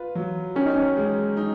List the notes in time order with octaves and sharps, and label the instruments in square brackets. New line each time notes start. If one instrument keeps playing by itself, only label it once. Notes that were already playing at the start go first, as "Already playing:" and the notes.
Already playing: [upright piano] F4 B4
F#3
[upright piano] D#3 [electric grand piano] C#4
[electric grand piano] D#4
C#4
[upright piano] G#3
D#4